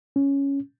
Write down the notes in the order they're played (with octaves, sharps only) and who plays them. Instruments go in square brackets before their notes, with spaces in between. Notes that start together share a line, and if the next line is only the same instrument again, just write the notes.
[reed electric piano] C#4